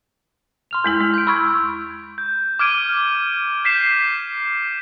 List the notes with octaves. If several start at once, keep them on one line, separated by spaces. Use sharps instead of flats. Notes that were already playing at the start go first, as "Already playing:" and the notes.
C6 F6 F7
E2 G#3 E4
G#3
G6 D7
B5 C#6 E6 G#6 D7
G6
D6 F6 G#6 D7 D#7
G6 B6 C7 E7